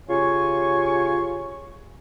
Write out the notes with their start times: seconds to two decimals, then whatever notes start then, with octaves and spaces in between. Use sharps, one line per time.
0.10 C#3 F4 G4 C#5 G#5 C#6